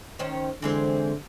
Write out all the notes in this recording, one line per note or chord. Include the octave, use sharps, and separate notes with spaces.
D#3 C#4 C5
D3 E3 G#3 C4